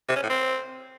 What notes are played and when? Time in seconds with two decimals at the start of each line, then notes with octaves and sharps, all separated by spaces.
0.09 C3
0.16 C#4
0.23 A2
0.30 C4